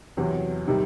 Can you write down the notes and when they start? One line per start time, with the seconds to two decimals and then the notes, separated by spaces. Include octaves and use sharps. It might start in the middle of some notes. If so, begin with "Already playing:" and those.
0.17 E2 C3 F#3
0.67 C3 D#3 G3